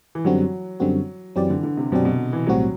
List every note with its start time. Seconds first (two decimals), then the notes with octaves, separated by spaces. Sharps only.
0.15 E3
0.25 F#2 D3 F#3 G3 C4 F#4
0.80 F#2 D3 G3 C4 F#4
1.36 F#2 E3 F#3 C4 G4 D5
1.50 D3
1.63 D3
1.77 C3
1.91 F#2 B2 F#3 C4 G4 D5
2.05 B2
2.33 E3
2.47 B1 A2 F#3 G3 C4 F#4